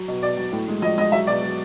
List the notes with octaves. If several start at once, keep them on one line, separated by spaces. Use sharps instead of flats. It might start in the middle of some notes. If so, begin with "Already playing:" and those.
Already playing: F#3
B2
B2 D5
F#3
A2
G#3
F3 D#5
G#3 D#5
F#3 E5
B2 D5
F#3